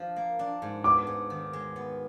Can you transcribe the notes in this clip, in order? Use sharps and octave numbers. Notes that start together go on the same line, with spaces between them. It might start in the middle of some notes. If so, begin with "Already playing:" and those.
Already playing: F3 D4
A#3
D4
G#2
B3 D6
G#2
D#3
G#3
B3